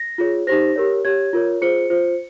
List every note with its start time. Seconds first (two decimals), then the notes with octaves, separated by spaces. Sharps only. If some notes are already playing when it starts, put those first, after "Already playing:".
Already playing: A#6
0.18 F4 G#4 C#5
0.47 D#4 G4 C5 A#6
0.76 G4 A#4 C#5
1.05 G4 C#5 G#6
1.33 F4 A#4 C#5
1.61 F4 G#4 C5 C#7
1.90 F4 C5